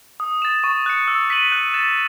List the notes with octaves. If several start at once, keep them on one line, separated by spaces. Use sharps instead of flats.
D#6
A6 E7
C#6
F#6 C#7
E6
B6 D#7 F#7
F#6
A6 E7